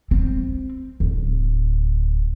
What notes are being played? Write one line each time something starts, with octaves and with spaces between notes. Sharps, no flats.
C4
D1